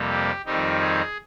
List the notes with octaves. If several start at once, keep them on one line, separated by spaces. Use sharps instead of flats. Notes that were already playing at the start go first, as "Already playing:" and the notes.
Already playing: F2 C3 G3 A#3
G4
F2 D#3 G3 C4 D#4 G4
G#4